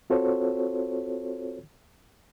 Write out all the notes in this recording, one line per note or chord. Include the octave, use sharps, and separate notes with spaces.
C4 F4 F#4 A4 C5 C#5